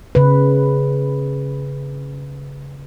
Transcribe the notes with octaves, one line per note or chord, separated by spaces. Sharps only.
C#3 B4